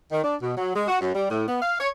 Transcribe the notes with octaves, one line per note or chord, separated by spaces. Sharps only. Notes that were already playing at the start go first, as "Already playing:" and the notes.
D#3
D4
B2
F#3
G#3
F#4
F#2
G3
A2
B3
F5
C#5